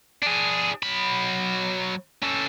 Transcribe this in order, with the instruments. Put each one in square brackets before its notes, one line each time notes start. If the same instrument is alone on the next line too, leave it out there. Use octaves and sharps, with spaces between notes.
[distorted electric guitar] D4 G#4
F#3 B5
C#4 A4